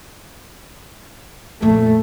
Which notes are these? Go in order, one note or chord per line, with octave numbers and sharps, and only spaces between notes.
F2 A#2 A3